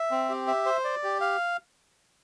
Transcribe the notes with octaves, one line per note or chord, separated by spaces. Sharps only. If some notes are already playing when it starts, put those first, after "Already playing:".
Already playing: E5
C4
G4
E5
C5
D5
G4
F5